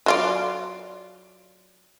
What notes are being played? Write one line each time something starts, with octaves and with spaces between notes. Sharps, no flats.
F#3 F4 D5